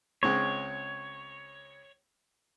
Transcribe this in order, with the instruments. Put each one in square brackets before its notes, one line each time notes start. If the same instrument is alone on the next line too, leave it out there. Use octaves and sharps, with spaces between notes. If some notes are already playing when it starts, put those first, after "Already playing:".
[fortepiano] C#2 G#3 C4 [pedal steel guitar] C#5